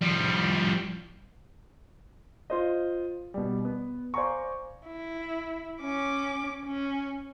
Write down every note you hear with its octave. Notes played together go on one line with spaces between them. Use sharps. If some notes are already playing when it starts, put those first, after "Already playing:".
F3 G3
F4 C5 D#5
B2 G3
B3
C5 D5 F5 G#5 A#5 C#6
E4
C#4 D6
C#4